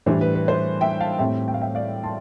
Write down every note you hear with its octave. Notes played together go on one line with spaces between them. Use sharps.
A2 E3 G3 D4 C5
B4
B4
C5
E5 G5
F5 A5
A2 G3 C4 E5 G5
G5
F5
E5 G5
D5 F5
A5 C6